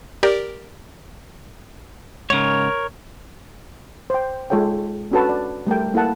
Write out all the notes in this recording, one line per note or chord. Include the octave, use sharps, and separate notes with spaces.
G4 A#4 D5
G#2 C#3 A#4 C#5
C5 G5
G#3 F4 A4 C#5 G5
C#4 D4 F#4 A4 B4 A5
D5
G3 A3 A#4 G5
A#3 E4 A4 F#5 A5